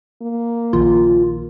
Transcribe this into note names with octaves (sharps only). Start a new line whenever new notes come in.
A#3
A#1 D#3 F4